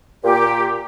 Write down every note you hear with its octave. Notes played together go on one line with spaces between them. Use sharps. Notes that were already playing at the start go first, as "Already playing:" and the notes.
A#2 G4